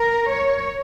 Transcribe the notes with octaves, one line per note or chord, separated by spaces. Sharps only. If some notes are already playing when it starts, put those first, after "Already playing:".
Already playing: A#4
C#5